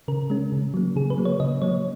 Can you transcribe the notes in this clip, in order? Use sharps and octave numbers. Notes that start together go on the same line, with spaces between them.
C#3 A#4
G#3 C#4
C#3
F#3 A#3
C#3 G#4
B4
F#3 A#3
C#5
C#3 D#5
F#3 A#3 C#5